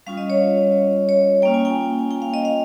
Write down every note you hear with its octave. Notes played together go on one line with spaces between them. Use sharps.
G3 C#4 F4 F5
D#5
C#5
C#5
A#3 C#4 F4 G5
G#5
G5
G5
F5
D#5
F5